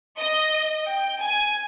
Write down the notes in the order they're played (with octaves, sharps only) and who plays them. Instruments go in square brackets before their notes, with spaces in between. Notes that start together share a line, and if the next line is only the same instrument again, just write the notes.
[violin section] D#5
G5
G#5